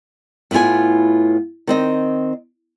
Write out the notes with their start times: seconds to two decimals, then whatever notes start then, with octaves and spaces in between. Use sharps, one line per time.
0.51 A2 B3 E4 F4 G#5
1.67 D#3 C4 D#5